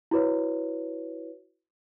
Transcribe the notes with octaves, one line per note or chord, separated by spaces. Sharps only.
E4 F#4 B4 C#5